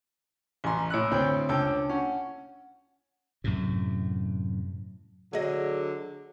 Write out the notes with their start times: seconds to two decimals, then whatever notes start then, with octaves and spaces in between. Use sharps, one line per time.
0.64 A1 G#5 A#5 C6
0.90 A2 C#5 B5 E6 F#6
1.11 D2 C4 G5
1.49 C#2 D4 C#5 G5 A5 E6
1.89 C#4 F#5
3.44 F#2 A2 C3
5.33 D3 F#3 G#4 D#5